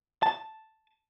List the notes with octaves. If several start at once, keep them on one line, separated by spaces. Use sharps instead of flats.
A5